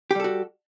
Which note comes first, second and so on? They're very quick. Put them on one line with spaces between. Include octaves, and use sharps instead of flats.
G4 G3 A4 F#4